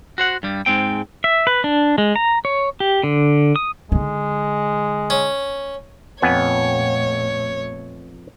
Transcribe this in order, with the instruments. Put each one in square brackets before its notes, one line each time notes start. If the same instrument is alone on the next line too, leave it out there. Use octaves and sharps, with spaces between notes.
[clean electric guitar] F#4 C5 F#5
G2 G3
G#2 G#3 C4 G5
[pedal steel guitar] E5
B4
D4
G#3
A#5
C#5
G4
D3
D#6
[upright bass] D3 D#4 [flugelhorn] G#3
[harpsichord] C#4
[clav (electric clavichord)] F2 B3 G#5 [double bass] A#2 A3 [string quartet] C#5